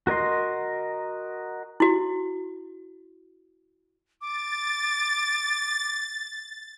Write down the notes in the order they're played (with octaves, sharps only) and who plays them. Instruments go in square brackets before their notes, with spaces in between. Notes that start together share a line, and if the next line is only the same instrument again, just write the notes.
[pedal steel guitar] F#4 A#4 D#5 C6
[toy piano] E4 F#4
[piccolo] D6 [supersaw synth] A6